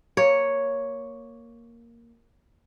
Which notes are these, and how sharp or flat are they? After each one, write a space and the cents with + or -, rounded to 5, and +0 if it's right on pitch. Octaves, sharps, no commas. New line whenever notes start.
A#3 +0 C#5 +0